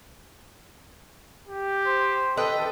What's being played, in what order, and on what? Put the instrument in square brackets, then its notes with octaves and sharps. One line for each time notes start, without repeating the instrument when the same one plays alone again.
[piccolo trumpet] G4
[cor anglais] C5
[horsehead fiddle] A4 [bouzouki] B4 D#5 G5